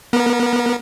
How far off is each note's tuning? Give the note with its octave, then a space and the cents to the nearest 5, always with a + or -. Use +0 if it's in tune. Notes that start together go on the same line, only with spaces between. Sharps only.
B3 -35 A#4 +0